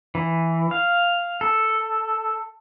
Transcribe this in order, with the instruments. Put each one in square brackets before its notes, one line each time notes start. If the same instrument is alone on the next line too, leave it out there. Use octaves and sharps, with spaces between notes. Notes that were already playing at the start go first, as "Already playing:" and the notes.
[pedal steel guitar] E3
F5
A4